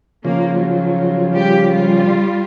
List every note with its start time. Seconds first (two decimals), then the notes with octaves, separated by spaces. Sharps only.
0.25 C#3 F3 A#3
0.56 F#3
1.30 G3 G4
1.71 G3 F4